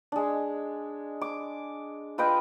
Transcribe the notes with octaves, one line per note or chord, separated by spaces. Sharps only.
G#3 D4
D6
F4 B4 D#5 G5